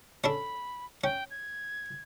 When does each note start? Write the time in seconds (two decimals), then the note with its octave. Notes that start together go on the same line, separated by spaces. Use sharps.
0.24 C#4 D4 A4 B5
1.04 C#4 G5
1.30 G#6